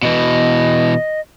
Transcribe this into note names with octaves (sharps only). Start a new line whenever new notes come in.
B2 E3 D#5